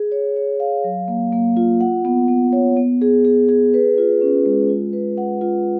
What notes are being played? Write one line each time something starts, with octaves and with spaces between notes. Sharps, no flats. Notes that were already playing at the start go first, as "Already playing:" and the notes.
Already playing: G#4
C#5
C#5
F5
F#3
A#3
A#3
F4
F#5
B3
B3
C#5
B3
G#4
G#4
G#4
B4
F4
C#4
G#3
F4
B4
F#5
F4